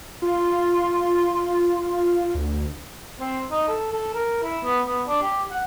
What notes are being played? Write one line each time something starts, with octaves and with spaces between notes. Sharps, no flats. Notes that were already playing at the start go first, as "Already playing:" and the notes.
F4 C6
D2
C4
D#4
A4
A4
A#4
E4
B3
B3
D4
G4
F#5